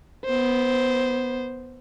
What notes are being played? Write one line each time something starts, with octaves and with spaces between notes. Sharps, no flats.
B3 C5